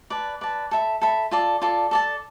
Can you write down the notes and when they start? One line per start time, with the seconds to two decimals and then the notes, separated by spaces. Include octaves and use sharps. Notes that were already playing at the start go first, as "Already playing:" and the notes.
0.10 B4 D5 A5
0.41 B4 D5 A5
0.71 A4 E5 B5
1.01 A4 E5 B5
1.31 F4 A4 D5
1.62 F4 A4 D5
1.91 A4 D5 A5